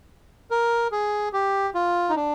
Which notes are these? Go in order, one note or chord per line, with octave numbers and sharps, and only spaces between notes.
A#4
G#4
G4
F4
D#4
D4